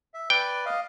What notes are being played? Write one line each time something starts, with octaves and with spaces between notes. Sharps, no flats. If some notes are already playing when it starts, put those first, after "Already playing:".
E5
B4 D5 G5
D#5 F5